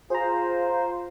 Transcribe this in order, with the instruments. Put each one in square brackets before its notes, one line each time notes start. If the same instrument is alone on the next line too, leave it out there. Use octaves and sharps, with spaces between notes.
[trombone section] F4 [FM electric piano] G#4 A#5 [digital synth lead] C5